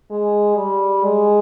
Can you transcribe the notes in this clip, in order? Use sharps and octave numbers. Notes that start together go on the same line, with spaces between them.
G#3
G3
G#3